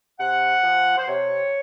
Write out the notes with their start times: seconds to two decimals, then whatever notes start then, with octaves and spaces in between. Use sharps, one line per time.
0.19 C3 F#5
0.63 F3
0.97 C5
1.07 C3 C#5